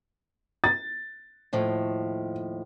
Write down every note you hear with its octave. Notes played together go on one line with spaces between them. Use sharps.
A6
D#2 A2 F3